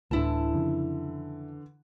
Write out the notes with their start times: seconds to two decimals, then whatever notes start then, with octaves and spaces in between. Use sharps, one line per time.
0.11 D1 D2 D3 E3 E4 A5
0.53 F2 C#3